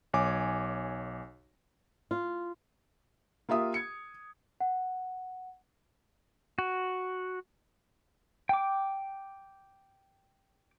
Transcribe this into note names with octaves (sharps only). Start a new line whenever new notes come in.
B1 C#5 G#5 D6
F4
A#3 F4 G4 E5 D#6
G#6 C#7
F#5
F#4
G5 D6